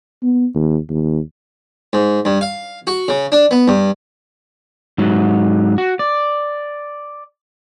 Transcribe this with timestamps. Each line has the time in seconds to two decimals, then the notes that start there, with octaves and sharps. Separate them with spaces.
0.23 B3
0.55 D#2
0.90 D#2
1.93 G#2
2.25 G2
2.41 F5
2.87 F#4
3.08 C#3
3.32 D4
3.51 B3
3.68 G2
4.98 G#2 F#3
5.78 F#4
5.99 D5